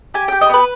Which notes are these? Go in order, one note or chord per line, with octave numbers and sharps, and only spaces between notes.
G4 G#5
G4 G5
D#5
B3 B4